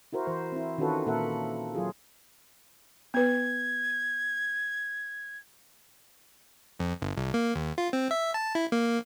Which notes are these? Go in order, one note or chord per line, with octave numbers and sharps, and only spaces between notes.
E4 F#4 A#4 C5
E3 C5
C4 E4
D#3 C#4 F4 F#4 A4 B4
A#2 A#3 A4 A#4 E5 F#5
F#3 F4 G#4
B3 B4 G#6
F2
G1
C2
A#3
D#2
F4
C4
E5
A5
E4
A#3